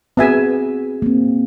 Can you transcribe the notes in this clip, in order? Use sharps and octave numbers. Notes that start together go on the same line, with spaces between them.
B3 C4 F#4 G#4 E5 G#5
A#3 C4